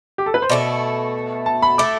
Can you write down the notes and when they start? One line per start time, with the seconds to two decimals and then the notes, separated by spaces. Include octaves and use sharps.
0.18 G4
0.26 A4
0.34 B4
0.42 C5
0.50 B2 A3 E4 D5
1.46 A5
1.62 B5
1.78 A3 E4 A4 D6